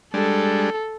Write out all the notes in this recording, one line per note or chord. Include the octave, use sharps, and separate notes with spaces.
G3 G#3 D4 A4